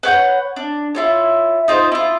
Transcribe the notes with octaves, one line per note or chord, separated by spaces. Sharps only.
B4 C#5 F#5 G6
D4
E4 F4 C#5
D#4 F4 B4 C5
E4 F4